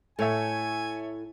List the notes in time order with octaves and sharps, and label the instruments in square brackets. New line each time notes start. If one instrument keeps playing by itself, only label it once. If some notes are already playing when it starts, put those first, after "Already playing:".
[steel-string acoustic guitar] A2 [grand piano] A4 C#5 E5 [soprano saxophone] G#5